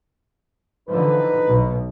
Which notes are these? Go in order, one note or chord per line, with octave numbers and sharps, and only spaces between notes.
D3 E3 F3 D#4 B4
B1 B2